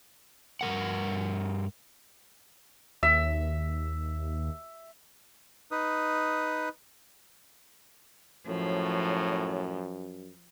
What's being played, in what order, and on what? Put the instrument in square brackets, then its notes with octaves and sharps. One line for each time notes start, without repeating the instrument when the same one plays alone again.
[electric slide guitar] G2 D#3 A#4 F#5
[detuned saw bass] D#2 [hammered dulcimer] E5
[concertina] D#4 B4 D#6
[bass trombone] F#2 [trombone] A2 [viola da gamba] F3 [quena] C#5